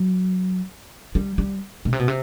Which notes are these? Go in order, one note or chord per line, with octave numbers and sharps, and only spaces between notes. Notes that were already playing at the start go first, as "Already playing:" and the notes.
Already playing: F#3
G3
G3
B2
C3
B2
C3